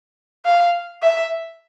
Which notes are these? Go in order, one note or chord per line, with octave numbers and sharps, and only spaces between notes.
F5
E5